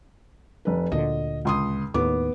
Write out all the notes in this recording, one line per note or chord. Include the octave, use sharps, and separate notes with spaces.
F1 B4
D2 A#2 D3 D#5
C#2 C6 D#6
D#2 A2 B3 D6